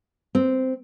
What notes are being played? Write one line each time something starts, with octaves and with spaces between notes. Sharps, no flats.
C4